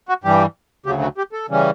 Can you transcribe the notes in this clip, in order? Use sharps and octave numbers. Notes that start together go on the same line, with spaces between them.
F#4
G2 E3 G3 G4
D2 C#3 F#3 G4
F#4
G4
A4
C#3 E3 G3 C#4